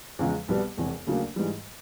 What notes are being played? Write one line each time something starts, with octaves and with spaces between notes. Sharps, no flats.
E2 C#3 F3 G#3
C2 B2 G3 B3
E1 E2 C3
D2 C#3 F#3 A#3 D4
G#2 E3 G3